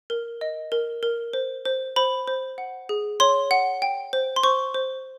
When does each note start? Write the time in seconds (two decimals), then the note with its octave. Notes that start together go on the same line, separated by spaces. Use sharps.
0.10 A#4
0.41 D#5
0.72 A#4
1.03 A#4
1.33 C5
1.65 C5
1.96 C5 B5
2.28 C5
2.58 F#5
2.89 G#4
3.20 C#5 C6
3.51 F#5
3.82 G5
4.13 C5
4.36 C6
4.44 C5 C#6
4.74 C5